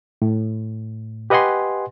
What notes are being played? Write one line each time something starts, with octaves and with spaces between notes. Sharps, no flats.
A2
G4 B4 D#5 F#5 G#5 C6